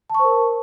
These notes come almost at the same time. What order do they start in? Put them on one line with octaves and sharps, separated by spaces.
A5 C#6 C5 A#4